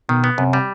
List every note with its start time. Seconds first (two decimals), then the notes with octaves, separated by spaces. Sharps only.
0.09 B2 D#3
0.24 B3
0.38 F#2 C3
0.53 G3